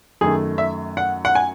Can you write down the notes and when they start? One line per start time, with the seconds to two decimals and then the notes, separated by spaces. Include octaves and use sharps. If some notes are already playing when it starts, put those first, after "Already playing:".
0.21 F#2 D#3 A3 G#4
0.58 E5
0.97 F#5
1.25 F#5
1.35 G#5